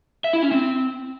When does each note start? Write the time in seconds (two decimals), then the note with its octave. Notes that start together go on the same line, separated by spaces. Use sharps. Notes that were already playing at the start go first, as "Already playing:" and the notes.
0.24 E5
0.33 E4
0.42 C#4
0.52 C4